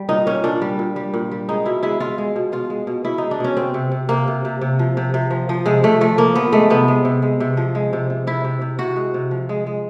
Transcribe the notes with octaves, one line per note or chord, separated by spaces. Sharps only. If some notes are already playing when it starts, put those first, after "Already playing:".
Already playing: G3
A#2 D#4
A#2 C#4
A#2 D4
G3
A#2
G3
A#2
G3
G#3 D#4
B2 E4
G#3 E4
G#3 F4
G#3
B2
B2 F4
G#3
B2
B2 E4
G#3 D#4
D4
B2 C#4
C3 C4
C3
C3
C3 A#3
C3
C3
C3
F3
C3
C3
F3
F3
C3 G#3
C3 A3
F3 A3
F3 A#3
F3 B3
G#3 A3
C3 B3
G#3
C3
G#3
C3
F3
G#3
C3
C3
C3 E4
C3
C3
C3 F#4
G#3
C3
F3
G#3
G#3